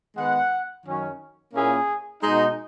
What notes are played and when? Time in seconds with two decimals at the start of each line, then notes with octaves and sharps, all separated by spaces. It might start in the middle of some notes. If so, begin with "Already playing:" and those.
0.17 D#3 G#3 B3 F#5
0.86 F#2 D#3 F#3 C#4
1.54 A#2 A#3 C#4 E4 G#4
2.23 B2 G#3 D#4